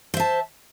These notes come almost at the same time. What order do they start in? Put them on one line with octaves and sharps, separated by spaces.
C5 E5 A5